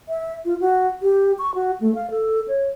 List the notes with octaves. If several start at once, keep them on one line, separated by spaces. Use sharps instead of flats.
E5
F4
F#4
G4
C#6
F#4
A3
F5
A4
C#5